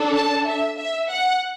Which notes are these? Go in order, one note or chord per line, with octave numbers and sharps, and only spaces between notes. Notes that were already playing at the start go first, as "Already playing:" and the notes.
Already playing: D4 A4
A5
E5
E5
F#5